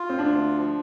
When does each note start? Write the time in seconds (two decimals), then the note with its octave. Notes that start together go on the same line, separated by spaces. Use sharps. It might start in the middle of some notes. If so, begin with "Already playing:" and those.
Already playing: F4
0.10 C4
0.18 D2 D4
0.55 F3